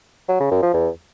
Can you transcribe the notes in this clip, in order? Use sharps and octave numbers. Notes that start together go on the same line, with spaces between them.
F#3
C#3
F#2
F3
E2